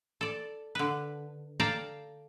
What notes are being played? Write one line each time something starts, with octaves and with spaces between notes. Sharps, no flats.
A4 D5
D3 B4
A4 D5 F5 G5 A#5